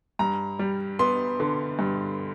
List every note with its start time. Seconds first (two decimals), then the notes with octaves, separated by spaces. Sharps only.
0.19 G2 A#5
0.59 G3
0.99 B3 C6
1.40 D3
1.79 G2